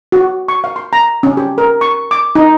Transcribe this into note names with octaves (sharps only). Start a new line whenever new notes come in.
F#4
C#6
F5
C6
A#5
C#4
G4
A#4
C#6
D6
D#4